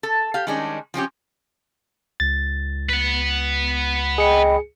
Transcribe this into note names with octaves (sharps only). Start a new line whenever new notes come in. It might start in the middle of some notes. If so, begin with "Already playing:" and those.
A4
G4 F5
D#3 G3 G#3 C#4 D4
F3 C4 C#4 G4
C#2 A6
B4 F#5
G#4 D#5 G5 B5 C#7